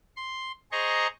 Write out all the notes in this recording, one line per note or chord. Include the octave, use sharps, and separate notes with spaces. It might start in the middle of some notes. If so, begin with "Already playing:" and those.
C6
G#4 C5 D#5 A#5 C#6